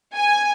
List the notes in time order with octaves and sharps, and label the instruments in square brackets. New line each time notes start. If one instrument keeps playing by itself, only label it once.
[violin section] G#5